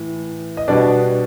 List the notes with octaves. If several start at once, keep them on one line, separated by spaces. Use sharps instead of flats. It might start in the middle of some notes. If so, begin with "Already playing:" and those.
Already playing: A2 E3
D#5
B2 G3 B3 D4 D5